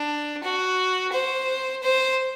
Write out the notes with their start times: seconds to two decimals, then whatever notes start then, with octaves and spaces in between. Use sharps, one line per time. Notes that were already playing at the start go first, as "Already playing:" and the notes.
Already playing: D4
0.44 F#4
1.13 C5
1.83 C5